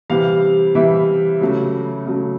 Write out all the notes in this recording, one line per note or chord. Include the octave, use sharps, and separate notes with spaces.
C3 E3 G3 F5
C3 E3 G3 E5
C#3 F#3 A3
C#3 F#3 A3